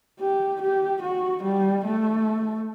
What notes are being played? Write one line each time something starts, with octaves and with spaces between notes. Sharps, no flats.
G4
G4
F#4
G3
A3